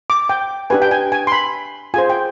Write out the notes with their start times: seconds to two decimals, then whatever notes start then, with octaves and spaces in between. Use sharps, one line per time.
0.10 D6
0.29 G5
0.70 D4 G4 B4 G#5
0.82 G5
0.91 G#5
1.12 G#5
1.27 C6
1.32 B5
1.94 F4 G#4 C5 G#5
2.10 G5